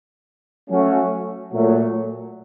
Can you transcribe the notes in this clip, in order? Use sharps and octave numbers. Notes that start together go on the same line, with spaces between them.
F#3 A3 C#4 F#4
A#2 F#3 A3